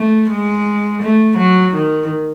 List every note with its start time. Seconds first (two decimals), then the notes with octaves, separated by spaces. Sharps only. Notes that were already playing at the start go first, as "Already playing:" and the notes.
Already playing: A3
0.30 G#3
1.02 A3
1.38 F#3
1.74 D#3